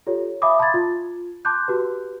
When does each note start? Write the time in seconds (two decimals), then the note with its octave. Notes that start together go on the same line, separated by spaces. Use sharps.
0.07 F4 G4 A4 C#5
0.42 E5 F5 G#5 B5 D6 D#6
0.59 A5 B5 C6 D6 G#6 A6
0.74 F4
1.45 A5 C6 D6 F#6 G6
1.68 F#4 G4 B4